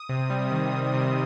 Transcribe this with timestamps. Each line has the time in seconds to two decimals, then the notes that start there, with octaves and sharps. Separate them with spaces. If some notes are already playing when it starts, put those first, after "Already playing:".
Already playing: D#6
0.09 C3
0.30 G3
0.51 D#3
0.72 C3
0.94 C3